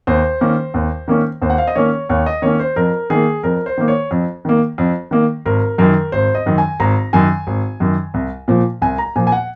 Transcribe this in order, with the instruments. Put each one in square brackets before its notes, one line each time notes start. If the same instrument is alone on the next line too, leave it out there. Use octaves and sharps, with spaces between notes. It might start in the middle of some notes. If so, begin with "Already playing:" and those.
[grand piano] D#2 C5
D#3 A#3 C#4
D#2
D#3 A#3 C#4
D#2 C5
F#5
F5
D#5
D#3 A#3 C#4 C#5
D#2 C#5
D#5
D#3 A#3 C#4 C#5
C5
F2 A#4
D#3 A#3 G#4
F2 A#4
C5
D#3 A#3
C#5
F2
D#3 A#3
F2
D#3 A#3
G#1 A#4
F#2 D#3 A#4
G#1 C5
D#5
F#2 D#3
G#5
G#1 A#5
F#2 D#3 G#5
G#1
F#2 D#3
C2
A#2 F3
C2 G#5
A#5
A#2 F3 G#5
G#5
F#5